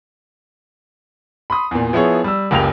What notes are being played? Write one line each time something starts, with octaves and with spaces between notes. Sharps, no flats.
B5 C6 D#6
E2 A#2
F3 B3 E4 G#4 C#5
G3 E6
F#1 C#2 F#2 G4 F7